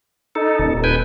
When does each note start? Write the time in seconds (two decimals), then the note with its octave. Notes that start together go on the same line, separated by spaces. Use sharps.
0.35 D#4 A4
0.59 D#1
0.84 B4 G5 G#5